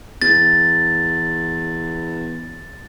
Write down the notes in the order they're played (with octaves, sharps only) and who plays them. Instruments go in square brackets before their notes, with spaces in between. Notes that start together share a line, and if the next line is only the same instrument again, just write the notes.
[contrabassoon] E2 [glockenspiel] A6